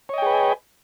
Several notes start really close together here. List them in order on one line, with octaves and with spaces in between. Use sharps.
C#5 D#5 G5 G#4 B4